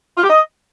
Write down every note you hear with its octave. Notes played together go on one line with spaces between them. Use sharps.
F4
G4
D#5